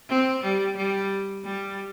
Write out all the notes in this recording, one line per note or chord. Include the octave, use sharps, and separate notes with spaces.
C4
G3
G3
G3